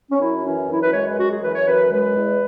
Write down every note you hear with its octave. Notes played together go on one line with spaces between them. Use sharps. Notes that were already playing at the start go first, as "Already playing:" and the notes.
C#4
F#2 E4
E3 C#4
F#2 E4
B4
G#3 C#5
B4
F#2 F#4
G#4
E3 B4
C#5
F#2 B4
G#3 B4
E2